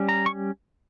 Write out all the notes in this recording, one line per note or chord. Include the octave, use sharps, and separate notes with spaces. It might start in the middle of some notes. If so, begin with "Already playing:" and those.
Already playing: G3 C#4
A#5
C#6